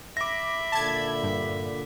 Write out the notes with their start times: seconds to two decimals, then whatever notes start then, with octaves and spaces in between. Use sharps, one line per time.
0.17 E5 B5 D6 A#6
0.72 A#2 D3 A5 G#6
1.23 G2